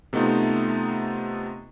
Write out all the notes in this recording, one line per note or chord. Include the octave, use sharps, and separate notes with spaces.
C3 A3 B3 D#4 F4